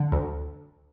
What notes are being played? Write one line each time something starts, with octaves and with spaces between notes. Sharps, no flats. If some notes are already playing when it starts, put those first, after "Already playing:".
Already playing: D3
D2